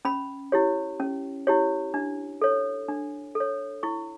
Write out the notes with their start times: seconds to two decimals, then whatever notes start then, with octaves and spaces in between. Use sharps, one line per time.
0.05 C#4 B5
0.52 E4 G4 C#5
1.00 C#4
1.47 E4 G4 C#5
1.94 D4
2.41 A4 C#5
2.88 D4
3.35 A4
3.40 C#5
3.83 E4 C#6